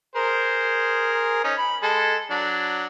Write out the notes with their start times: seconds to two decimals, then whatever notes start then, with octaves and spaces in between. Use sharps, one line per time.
0.16 G#4 A#4 C5
1.44 C#4 D#4
1.58 B5
1.83 G#3 A4
2.30 F#3 D4